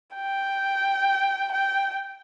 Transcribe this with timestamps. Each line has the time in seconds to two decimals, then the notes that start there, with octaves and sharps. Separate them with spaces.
0.15 G5
1.52 G5